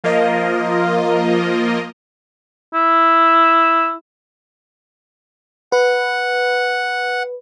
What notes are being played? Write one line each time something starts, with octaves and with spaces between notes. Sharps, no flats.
F3 A#3 F4 A#4 D#5
E4
B4 F#5